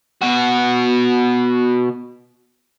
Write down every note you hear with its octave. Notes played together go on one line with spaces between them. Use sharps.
B2 F#4